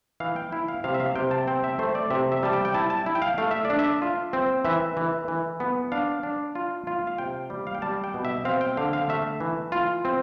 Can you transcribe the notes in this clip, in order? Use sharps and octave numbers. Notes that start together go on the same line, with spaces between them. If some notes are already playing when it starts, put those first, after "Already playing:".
E3 F5
G5
E4
F5
C3 F5
E5
F5
C3 G5
A5
C4 G5
E5
A3 C5
D5
C3 E5
E5
G3 A5
G5
G5
E4 A5
A5
E4
G5
F5
A3 F5
E5
D5
D4
E5
F4
C4
E3 E5
E3
E3
B3
D4 F5
D4
F4
F4
F5
C3 G5
G3
F5
G5
G3 A5
G5
B2
E5
C4 F5
G5
D3 F5
F5
A3 E5
E3
F4
C4